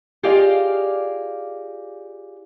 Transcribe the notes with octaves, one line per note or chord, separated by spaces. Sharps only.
F4 G4 G#4 D5 D#5 F5